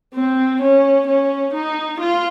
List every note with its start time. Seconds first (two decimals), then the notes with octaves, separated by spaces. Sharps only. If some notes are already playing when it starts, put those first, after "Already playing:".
0.14 C4
0.62 C#4
1.07 C#4
1.54 D#4
2.00 F4